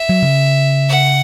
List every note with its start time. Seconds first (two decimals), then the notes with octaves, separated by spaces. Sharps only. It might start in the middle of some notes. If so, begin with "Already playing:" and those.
Already playing: E5
0.09 F#3
0.22 C#3
0.89 F#5